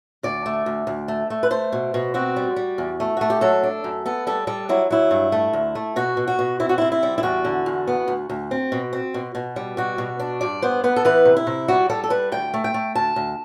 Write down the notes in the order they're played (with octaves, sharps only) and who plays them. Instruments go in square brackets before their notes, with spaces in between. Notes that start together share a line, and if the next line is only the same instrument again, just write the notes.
[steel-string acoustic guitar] D2 D5
A3
D2
D2
A3
A3
B4
A3 C5
B2
B2
C4 F#4
G3
G3
E2
A3
A3 F#4
G4
F#3 A4
D4
F#2
B3 A4
G3 A4
G3 A4
F#3 E4
F#3 E4
G2
A3
D2
A3
B2 F#4
B2
F#4
B2
C4 E4
F#4
C3 E4
E4
G3
E4
E2 F#4
D3
E2
B3
D2
D2
C4
B2
C4
B2
B2
G3
B2 F#4
B2
D4
G2 D5
B3 C5
B3 B4
A4
E3 B4
C3
E4
C3
G3 F#4
G3 A4
A4
G3 B4
D2 G5
A3
G5
A3
D2 A5
D2